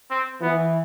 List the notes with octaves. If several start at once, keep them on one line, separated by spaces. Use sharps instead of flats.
C4
E3 B3